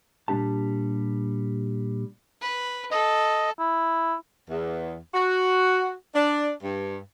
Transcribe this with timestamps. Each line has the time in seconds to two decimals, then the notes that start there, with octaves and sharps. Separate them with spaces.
0.28 A#2 G3 G#3 D4 G4 A5
2.41 B4
2.91 A4 D#5
3.59 E4
4.49 E2
5.13 F#4
6.14 D4
6.62 G2